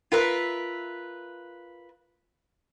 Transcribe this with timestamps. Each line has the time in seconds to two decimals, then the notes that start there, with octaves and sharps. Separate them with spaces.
0.12 F4 A#4 B4 E5